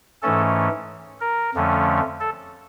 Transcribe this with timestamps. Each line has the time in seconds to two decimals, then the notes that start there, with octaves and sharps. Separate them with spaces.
0.22 G#2 E3 A3 C#4 A4
1.21 A#4
1.54 F2 D3 F3 A3 C#4
2.20 A4